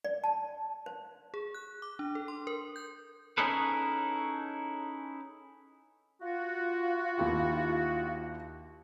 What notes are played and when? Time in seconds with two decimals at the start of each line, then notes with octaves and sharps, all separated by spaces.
0.05 D5
0.24 A5
0.86 C5
1.34 G#4
1.54 F#6
1.82 D6
1.99 D4
2.15 A4
2.28 C6
2.47 A#4
2.76 G6
3.38 C#4 D#4 E4 G#4 A4 B4
6.22 F4 F#4
7.18 D#2 E4 G4